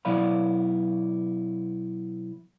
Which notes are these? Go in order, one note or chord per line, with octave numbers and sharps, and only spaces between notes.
B2 F#3 E4 D5 F5 B5